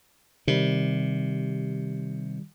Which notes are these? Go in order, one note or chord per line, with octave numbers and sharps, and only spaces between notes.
C3 D#3 G3